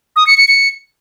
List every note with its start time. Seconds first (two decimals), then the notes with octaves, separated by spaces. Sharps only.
0.16 D#6
0.27 C#7
0.37 C#7
0.48 C#7